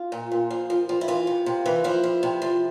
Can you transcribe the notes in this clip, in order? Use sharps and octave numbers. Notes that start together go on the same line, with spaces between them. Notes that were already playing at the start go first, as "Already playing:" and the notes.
Already playing: F4
A#2
A#2
F3
F3
F3
E4
E3 F4
C3
C3
E3
F3 E4
F3
C3
F3